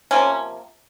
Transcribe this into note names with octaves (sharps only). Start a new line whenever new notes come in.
C3 F3 A#3 C#4